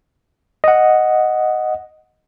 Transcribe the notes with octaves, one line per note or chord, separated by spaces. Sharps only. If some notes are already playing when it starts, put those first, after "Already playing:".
D#5 F#5